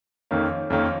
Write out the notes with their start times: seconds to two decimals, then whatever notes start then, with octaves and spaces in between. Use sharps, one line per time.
0.31 F2 D#3 A#3 C#4
0.70 F2 D#3 A#3 C#4